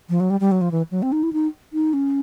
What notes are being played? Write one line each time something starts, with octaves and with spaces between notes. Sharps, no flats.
F3
F#3
G3
G3
F#3
F3
E3
F#3
C4
D#4
E4
D#4
D#4
C#4